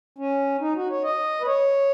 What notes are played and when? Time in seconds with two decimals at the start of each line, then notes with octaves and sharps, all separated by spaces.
0.18 C#4
0.61 D#4
0.76 F#4
0.90 C#5
1.04 D#5
1.41 B4
1.46 C#5